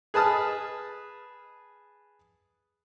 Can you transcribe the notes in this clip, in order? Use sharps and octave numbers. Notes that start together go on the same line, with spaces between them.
G#4 B4 A5 D#6 F6